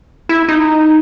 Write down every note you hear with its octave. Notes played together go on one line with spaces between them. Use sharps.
E4
D#4